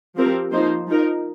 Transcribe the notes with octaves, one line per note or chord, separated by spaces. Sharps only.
F3 C4 G4 A#4
F3 A#3 D#4 C5
F3 D#4 A#4